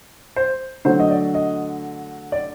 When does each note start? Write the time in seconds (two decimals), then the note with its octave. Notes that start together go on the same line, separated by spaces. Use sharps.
0.36 C5
0.85 D3 F#3 A3 C5
1.00 D#5
1.10 D5
1.34 D#5
2.32 D5